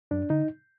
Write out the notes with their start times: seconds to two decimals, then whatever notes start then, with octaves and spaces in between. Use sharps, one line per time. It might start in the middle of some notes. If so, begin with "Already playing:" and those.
0.11 F#2 D4
0.30 D3 D#4